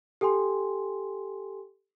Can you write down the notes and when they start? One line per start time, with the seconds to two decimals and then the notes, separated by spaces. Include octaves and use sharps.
0.21 G4 A4 G5 G#5 C6